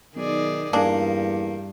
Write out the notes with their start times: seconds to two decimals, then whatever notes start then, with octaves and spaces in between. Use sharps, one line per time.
0.16 B1 D#3 G#4 D5
0.73 E2 G2 D#3 G#3 A#3 D4